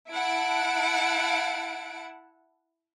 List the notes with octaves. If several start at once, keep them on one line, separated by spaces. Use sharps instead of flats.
E4 F#5 A5 D7